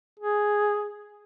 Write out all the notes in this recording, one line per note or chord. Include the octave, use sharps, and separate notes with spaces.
G#4